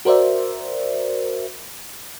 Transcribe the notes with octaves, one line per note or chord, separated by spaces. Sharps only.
F#4 A#4 C5 D5 E5